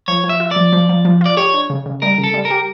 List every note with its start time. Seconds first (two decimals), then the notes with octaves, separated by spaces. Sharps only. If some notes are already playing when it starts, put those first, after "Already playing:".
0.08 F3 C#5
0.24 F3
0.29 E5
0.40 F4
0.51 F3 D5
0.72 F3
0.89 F3
1.05 F3
1.21 F4 D5
1.37 G4 C#5
1.54 D4
1.70 C#3
1.86 C#3
2.02 G3 A#4
2.18 C#3
2.24 A4
2.34 G3
2.45 A#4
2.51 G4